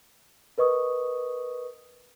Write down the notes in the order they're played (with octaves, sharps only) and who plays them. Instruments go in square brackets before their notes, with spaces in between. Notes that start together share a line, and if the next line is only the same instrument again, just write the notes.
[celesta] A#4 B4 D#5 C#6 D#6